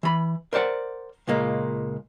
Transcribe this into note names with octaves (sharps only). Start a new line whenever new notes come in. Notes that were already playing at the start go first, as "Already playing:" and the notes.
E3 B5
A#4 C5 D5 F#5
C#2 A#2 G#3 A#3